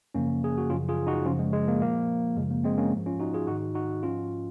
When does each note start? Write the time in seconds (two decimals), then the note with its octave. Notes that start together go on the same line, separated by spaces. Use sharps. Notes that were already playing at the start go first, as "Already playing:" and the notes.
0.15 F#2 C#3 F3 A#3 C#4
0.44 G#4
0.58 F#4
0.70 F#2 C#3 F3 C#4 F4
0.88 F4 G#4
1.07 D#4 F#4
1.25 F#2 C#3 F3 C#4 F4
1.39 G#3
1.53 G#3
1.68 A#3
1.81 A#2 F3 A#3
2.37 F#2 C#3 F3 G#3
2.51 A#3
2.64 G#3 C4
2.78 A#3 C#4
2.92 G#2 F3
3.06 C#4 F4
3.20 D#4 F#4
3.34 F4 G#4
3.47 G#2 D#3 D#4 F#4
3.75 D#4 F#4
4.02 G#2 F3 C#4 F4